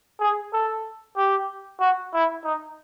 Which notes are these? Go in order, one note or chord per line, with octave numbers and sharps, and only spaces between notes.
G#4
A4
G4
F#4
E4
D#4